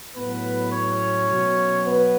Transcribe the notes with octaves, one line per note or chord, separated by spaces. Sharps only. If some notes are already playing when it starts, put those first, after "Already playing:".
A2 F#3 B3 B4
C#4 C#5
B2 F#3
B3 B4